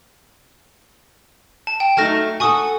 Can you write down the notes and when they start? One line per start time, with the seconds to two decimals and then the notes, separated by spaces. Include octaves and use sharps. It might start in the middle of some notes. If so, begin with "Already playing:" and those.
1.67 A5
1.80 G5
1.97 F#3 A3 D#4 A5 F6 A#6
2.40 F#4 A4 G#5 C#6 D#6